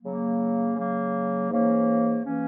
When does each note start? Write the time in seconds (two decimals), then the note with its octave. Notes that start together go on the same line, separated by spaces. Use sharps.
0.02 C#3 F#3 A#3
0.75 C#3 F#3 A#3
1.49 G#2 E3 A#3 C#4
2.24 E3 A#3 C#4